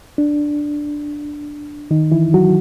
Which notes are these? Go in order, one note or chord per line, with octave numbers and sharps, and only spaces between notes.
D4
D#3 D#4
E3 E4
F#3 F#4